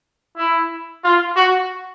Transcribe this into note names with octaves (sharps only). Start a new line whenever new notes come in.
E4
F4
F#4